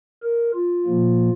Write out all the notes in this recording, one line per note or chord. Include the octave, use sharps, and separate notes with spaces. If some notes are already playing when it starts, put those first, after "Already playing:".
A#4
F4
A#2 F3 A#3